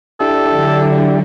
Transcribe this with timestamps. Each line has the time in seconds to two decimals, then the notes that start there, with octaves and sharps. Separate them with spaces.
0.20 D4 E4 G4 A4
0.53 D3 F#3